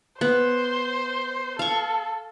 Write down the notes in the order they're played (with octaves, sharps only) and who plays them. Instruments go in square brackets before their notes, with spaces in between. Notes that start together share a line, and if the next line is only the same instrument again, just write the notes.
[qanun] B3 [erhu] C5
[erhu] A4 [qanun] F5 C#6